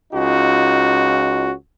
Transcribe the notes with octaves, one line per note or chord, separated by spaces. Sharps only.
C#2 C#4 D#4 F4 F#4